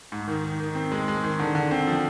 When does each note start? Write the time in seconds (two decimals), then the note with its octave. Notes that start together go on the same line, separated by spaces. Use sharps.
0.12 G#2
0.27 D#3
0.44 D#3
0.60 D#3
0.75 C4
0.92 G#3
1.08 G#3
1.23 D#3
1.39 D3
1.55 D3
1.71 C4
1.87 F3